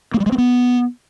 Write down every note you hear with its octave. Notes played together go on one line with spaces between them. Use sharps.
A#3
G3
G#3
C4
B3